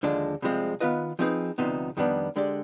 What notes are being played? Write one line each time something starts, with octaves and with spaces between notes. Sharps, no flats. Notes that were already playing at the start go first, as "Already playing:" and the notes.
D#2 D3 F3 G#3 D4
C2 C3 F3 G#3 C4
D#3 B3 F4 B4 D#5
F3 C4 D#4 G#4 B4
D2 C3 F3 B3 D#4
F2 D#3 G3 B3 D4
D3 G#3 D4 G4 D5